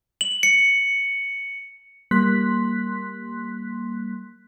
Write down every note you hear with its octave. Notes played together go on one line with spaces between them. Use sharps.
F#7
C#7
G3 A#3 C6 F#6 B6